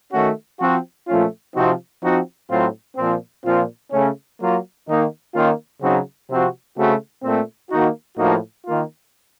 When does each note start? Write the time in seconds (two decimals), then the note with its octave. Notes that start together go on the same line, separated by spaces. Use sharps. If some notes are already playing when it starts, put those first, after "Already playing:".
0.12 D#3 A3 C#4 F#4
0.60 F3 C4 F#4
1.08 A#2 F3 A3 C#4 F4
1.54 C3 F3 C4 D#4 F#4
2.02 F3 C4 D#4 F#4
2.49 A2 F#3 C4 F4
2.97 A#2 F3 C4
3.44 A#2 F3 C4 F4
3.92 C#3 A3 C#4
4.39 F#3 A#3 F4
4.87 D#3 A#3 D#4
5.34 D#3 A#3 C#4 F4
5.81 C#3 F#3 C4 D#4 F#4
6.28 C3 F3 C4 F#4
6.76 C#3 A3 C4 F#4
7.23 A#2 A3 C4
7.71 D#3 A#3 D#4 F#4
8.18 A2 F3 A#3 D#4 F#4
8.66 D#3 A#3 F4